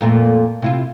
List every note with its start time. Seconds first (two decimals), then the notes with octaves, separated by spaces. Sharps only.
0.01 F2 A#2 A3
0.62 C3 E4 F4